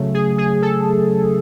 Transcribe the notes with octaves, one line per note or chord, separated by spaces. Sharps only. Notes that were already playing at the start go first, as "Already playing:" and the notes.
Already playing: C#3 F#3 A3
G#4
G#4
A4